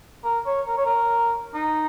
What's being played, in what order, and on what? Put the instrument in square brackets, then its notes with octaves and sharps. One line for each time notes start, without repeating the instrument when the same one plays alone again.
[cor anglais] A#4
C#5
A#4
C#5
A#4
D#4